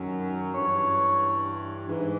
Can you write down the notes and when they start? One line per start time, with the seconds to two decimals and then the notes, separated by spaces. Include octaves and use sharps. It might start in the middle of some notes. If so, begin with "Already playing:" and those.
Already playing: F#2 D#3 F#3
0.52 G2 E3 C#5
1.88 G#2 E3